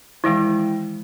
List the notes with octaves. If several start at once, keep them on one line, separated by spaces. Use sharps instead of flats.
D#3 E3 G#3 E4 G5